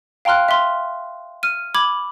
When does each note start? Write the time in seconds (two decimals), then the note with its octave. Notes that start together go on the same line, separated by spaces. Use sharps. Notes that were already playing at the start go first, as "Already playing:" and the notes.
0.25 F5 G5 A#5 C6 F6 F#6
0.49 E5 C6 F6
1.43 F6 D#7
1.74 B5 D6 G#6 F#7